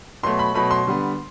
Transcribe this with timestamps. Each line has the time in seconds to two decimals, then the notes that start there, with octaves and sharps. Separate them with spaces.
0.23 B2 F#3 A3 C6
0.39 B5
0.54 B2 F#3 A3 B5
0.71 C6
0.87 D3 G3 B3